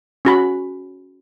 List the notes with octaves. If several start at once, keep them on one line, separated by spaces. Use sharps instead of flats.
C#4 F#4 B5